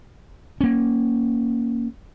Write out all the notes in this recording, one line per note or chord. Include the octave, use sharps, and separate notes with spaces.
A#3 C#4